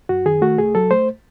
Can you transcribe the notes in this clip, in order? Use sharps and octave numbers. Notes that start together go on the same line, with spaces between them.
F#2 F#4
D#3 G#4
A3 F#4
C2 G#4
F#3 A4
A3 C5